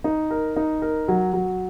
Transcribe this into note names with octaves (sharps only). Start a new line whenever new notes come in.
D#4
A#4
D#4
A#4
F#3
F#3